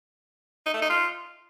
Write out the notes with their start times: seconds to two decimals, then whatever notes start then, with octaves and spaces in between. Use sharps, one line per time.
0.66 D#4
0.74 A3
0.82 D#4
0.90 F4